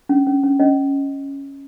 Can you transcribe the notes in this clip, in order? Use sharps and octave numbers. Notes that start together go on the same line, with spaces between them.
C#4
C#4
C#4
C#4 D#5